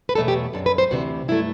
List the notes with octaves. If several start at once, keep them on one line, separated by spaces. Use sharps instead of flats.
B4
E2 B2 F#3 A3 A4
G4
F#2 D3 F#3 A4
B4
C5
D2 C3 E3 F#4
G2 F#3 A3 E4